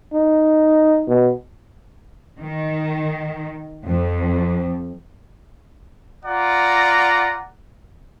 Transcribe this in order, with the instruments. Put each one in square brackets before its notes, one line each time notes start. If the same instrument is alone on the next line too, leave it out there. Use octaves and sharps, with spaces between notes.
[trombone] D#4
B2
[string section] D#3
F2
[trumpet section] F4 D5 F#5 A#5